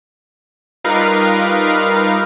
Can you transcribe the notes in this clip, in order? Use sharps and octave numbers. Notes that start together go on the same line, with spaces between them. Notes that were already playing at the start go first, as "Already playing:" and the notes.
G3 D#4 F4 A#4 B4 F5